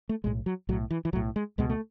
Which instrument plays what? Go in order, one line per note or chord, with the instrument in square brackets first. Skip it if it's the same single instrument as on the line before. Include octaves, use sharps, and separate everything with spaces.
[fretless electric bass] A3
B1 A2 G#3
F#3
B1 A2 F#3
E3
E3
B1 F#3
A2
G#3
C#2 B2 G#3
A3